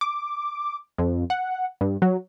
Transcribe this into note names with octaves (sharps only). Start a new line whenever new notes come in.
D6
F2
F#5
G2
F#3